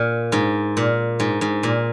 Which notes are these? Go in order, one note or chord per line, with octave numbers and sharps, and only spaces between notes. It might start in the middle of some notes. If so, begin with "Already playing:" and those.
Already playing: A#2
G#2
A#2
G#2
G#2
A#2